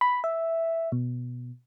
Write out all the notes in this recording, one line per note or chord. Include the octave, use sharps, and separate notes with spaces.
B5
E5
B2